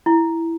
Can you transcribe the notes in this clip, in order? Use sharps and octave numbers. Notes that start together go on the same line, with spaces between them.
E4